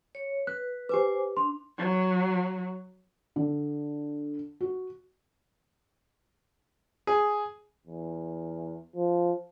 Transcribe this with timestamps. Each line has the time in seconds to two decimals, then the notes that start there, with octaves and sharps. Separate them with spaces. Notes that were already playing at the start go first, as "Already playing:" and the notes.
0.15 C#5
0.47 B4 F#6
0.89 G4 B4 C5 G#5 D6
1.37 D4 C6
1.78 F#3
3.36 D3
4.61 F#4
7.07 G#4
7.86 E2
8.96 F3